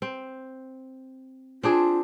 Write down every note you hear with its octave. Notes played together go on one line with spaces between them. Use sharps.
C4
C4 D4 F4 G#4